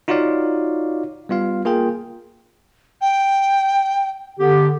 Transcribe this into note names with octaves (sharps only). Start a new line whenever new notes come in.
D#4 F4 F#4 C#5 D5 F5
G3 B3 F4 F5
A#3 F4 G#4 A#4 G5
G5
D3 B3 G4